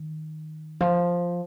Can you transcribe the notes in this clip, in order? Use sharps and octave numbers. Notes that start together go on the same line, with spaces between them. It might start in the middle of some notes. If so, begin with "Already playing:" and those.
Already playing: D#3
F3